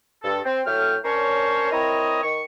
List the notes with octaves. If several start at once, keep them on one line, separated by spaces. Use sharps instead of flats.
G2 A4
C4
A2 F#3 A3 G5 F6
C#4 D4 A#4 C5 C#5
C4 E4 A#4 C#5 D#5
D#3 C#6